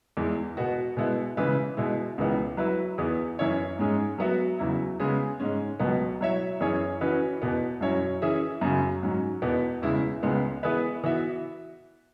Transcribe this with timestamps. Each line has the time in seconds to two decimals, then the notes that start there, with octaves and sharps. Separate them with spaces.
0.17 E2 E3 G#3
0.57 B2 B3 F#4
0.97 B2 G#3 B3 E4
1.37 C#3 E3 G#3 E4 B4
1.77 B2 G#3 E4
2.18 C#2 C#3 E3 B3
2.57 F#3 E4 B4
2.98 E2 E3 B3 G#4
3.39 F#2 E3 C#4 E4 C#5
3.79 G#2 G#3 C#4 G#4
4.18 F#3 B3 F#4 E5
4.59 E2 C#3 F#3 E4
5.00 C#3 G#3 B3 G#4
5.40 G#2 G#3 C#4
5.80 C#2 B2 F#3 B3
6.21 F#3 E4 C#5 E5
6.60 F#2 E3 C#4 G#4 C#5
7.01 E3 C#4 F#4 B4
7.42 E2 B2 B3
7.81 F#2 F#3 C#4 E4 C#5
8.22 E3 C#4 G#4 E5
8.61 F#2 C#3 F#3
9.03 G#2 F#3 C#4
9.42 E2 B2 B3
9.82 E2 C#3 G#3 E4
10.23 C#2 C#3 G#3 B3
10.63 E3 B3 G#4 B4 E5
11.04 E3 B3 F#4 E5